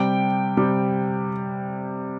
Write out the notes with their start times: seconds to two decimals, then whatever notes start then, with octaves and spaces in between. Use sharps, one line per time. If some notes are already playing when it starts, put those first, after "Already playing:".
Already playing: C3 G3 G5
0.57 C3 G3